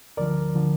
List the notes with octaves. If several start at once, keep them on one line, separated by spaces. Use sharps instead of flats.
D2 D3 F3 A#4 D5
D3 F3